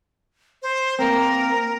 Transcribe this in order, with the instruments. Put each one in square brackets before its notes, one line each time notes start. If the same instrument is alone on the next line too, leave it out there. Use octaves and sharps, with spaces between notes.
[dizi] C5
[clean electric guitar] A#3 C4 [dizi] A#4